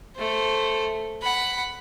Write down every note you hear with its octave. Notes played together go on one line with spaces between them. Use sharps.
A3 C5
F#5 B5